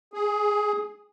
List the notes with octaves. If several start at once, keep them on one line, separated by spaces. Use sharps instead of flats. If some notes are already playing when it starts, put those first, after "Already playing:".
G#4